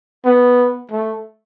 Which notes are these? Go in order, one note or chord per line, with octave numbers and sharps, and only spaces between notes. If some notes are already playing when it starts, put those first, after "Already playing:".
B3
A3